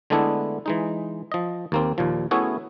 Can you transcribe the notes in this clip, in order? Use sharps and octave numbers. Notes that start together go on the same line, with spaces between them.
D3 G#3 A3 B3 D4 E4
E3 G#3 D#4
F3 D#5
D#2 A#3 C4
D#2 A#2 F3
A3 B3 C#4 E4 F#4 G#4